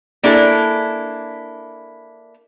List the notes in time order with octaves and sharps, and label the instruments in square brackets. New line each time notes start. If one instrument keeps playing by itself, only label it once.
[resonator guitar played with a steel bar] A#3 D4 E4 G#4 A4